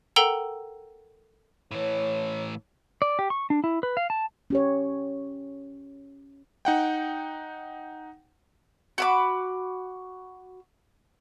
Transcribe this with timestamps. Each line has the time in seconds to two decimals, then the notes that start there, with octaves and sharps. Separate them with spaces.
0.16 A4 A#4 F#5 G5 A#5 E6
1.71 A2 E3 C#5
3.02 D5
3.19 G4
3.30 C#6
3.50 D4
3.64 E4
3.83 B4
3.97 F5
4.10 A5
4.50 C#4 G4 C#5
6.65 D#4 F#5 G5
8.98 F#4 B5 D6